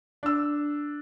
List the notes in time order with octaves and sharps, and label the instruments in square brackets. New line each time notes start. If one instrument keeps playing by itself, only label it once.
[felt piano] D4 E6